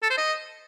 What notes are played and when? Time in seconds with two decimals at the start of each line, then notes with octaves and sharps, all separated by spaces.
0.03 A4
0.10 C5
0.18 D#5